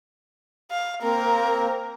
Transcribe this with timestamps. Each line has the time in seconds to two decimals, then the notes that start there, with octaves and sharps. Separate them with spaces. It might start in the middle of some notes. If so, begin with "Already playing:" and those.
0.71 F5
1.03 A#3 C4 A#4